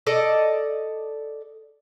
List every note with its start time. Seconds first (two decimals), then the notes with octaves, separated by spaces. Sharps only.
0.07 A4 D5 D#5